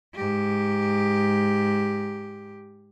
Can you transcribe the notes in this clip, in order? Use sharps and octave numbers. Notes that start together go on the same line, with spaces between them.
G#2 G4